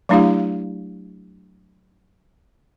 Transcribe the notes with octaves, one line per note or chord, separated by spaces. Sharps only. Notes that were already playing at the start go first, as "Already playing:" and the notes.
F#3 A3 D4 E4 G4 F5